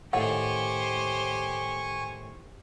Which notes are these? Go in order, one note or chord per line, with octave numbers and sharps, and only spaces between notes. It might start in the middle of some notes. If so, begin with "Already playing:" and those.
A2 D#3 G4 C5 F#5 G#5 C#6